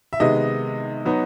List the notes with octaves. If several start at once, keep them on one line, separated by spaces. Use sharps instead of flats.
E5
C3 D#3 G#3 B3 D#5
F#3 B3 D#4